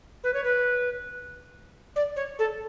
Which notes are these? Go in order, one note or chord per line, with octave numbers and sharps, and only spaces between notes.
B4
C#5
B4
D5
C#5
A4